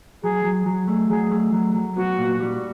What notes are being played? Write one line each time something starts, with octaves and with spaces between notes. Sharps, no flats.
F#3 G#4
F#3
F#3
A3
F#3 G#4
A3
F#3
F#3
B3 F#4
A#2
G3